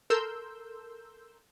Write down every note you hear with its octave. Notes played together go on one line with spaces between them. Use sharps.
A4 A#4 C6 E6 G6